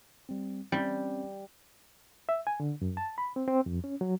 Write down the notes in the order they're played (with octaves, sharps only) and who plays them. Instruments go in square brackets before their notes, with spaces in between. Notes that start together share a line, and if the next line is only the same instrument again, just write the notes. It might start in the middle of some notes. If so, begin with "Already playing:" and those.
[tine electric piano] G3 C4
[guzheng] G3 [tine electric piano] C4 C#4
[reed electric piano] E5
G#5
D3
F#2
A5
B5
C4
C4
F2
C#4
F#3